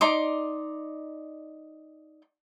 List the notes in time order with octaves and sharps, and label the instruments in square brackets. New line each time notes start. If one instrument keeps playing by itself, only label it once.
[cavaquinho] D#4 D5 C6 D6